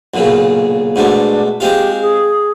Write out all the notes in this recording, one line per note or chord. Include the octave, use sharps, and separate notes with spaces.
B1 A#2 C#3
G#2 B2 A3 D4
G#3 C4 F4 G4
G#4